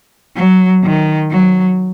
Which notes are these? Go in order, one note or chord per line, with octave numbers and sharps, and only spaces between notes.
F#3
D#3
F#3